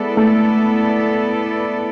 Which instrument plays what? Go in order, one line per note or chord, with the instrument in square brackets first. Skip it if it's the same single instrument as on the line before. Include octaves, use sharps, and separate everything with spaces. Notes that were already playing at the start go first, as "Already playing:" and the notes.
Already playing: [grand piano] G#3 [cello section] B3 E4 A4 D5
[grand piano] A3